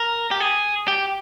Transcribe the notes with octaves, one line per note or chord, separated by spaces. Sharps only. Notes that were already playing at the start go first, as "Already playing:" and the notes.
Already playing: A#4
G4
G#4
G4